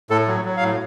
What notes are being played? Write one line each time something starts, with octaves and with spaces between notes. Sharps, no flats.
A2 A4
F#3
F#3
F5
A2